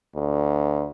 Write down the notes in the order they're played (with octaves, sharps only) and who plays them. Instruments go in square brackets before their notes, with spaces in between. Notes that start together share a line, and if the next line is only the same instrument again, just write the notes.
[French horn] D2